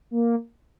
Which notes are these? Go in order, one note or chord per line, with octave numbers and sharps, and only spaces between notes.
A#3